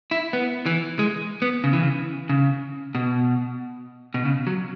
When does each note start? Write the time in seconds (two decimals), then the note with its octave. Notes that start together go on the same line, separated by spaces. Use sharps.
0.11 E4
0.33 B3
0.66 E3
0.99 G#3
1.42 B3
1.64 C#3
1.73 E3
1.82 C#3
2.29 C#3
2.95 B2
4.14 B2
4.25 C#3
4.47 F#3